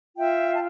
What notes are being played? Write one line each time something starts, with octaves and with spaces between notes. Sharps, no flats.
F4 E5 G5
A5